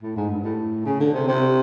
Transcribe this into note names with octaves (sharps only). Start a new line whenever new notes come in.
A2
G#2
G2
A2
C#3
D3
C3
C3